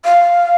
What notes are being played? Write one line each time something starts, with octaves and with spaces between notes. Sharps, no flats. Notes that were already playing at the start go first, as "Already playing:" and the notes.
F5